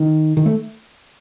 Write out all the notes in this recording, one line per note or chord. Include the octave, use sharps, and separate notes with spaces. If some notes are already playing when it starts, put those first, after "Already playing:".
Already playing: D#3
D#3
A3